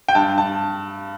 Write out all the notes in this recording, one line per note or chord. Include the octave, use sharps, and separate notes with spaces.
G5
G2 A5
A5